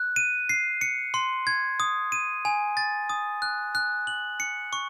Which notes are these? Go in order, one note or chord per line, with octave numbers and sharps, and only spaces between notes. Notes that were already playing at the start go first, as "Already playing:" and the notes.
Already playing: F#6
D#7
C7
C#7
C6
G#6
D#6
D#7
G#5
A6
D#6
F#6
F#6
F#7
C#7
C#6